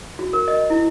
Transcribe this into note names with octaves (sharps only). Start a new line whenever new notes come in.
F#4
A#4
D#5
E4